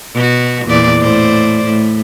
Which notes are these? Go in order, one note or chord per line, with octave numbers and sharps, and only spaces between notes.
B2 F#4
E2 A#2 D5
A2 C5 D5
A2